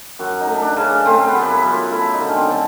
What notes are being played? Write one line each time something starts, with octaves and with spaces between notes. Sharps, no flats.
F#2 F#4
D#4
A3
D4
C#3
C#4
A3 C4
B3
F#2
E4
F#2
F4
A3 E4
D#4
D3
C#4
C4
D3